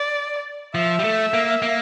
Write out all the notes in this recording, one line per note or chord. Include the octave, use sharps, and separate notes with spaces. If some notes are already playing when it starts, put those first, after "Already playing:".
Already playing: D5
F3 E5
G3
A3
A#3
A#3